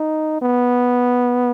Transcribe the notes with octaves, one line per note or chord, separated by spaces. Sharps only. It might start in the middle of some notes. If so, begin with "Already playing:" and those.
Already playing: D#4
B3